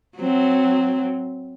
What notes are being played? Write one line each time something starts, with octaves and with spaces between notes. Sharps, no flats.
F#3 C4